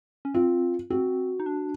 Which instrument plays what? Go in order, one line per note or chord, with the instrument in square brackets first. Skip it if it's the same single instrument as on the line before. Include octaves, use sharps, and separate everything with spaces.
[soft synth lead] C#4
[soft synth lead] C4 [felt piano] F4
[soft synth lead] C4 [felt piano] F#4
[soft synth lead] D#4
D4